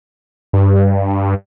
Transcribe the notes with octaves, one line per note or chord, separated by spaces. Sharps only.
G2